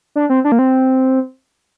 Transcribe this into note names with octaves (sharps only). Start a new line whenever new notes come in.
D4
C4
D4
A#3
C4